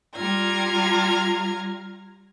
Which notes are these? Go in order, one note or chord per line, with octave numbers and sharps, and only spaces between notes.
G3 F4 A#5 F6 G#6